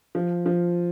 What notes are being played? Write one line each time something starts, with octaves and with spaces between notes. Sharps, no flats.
F3
F3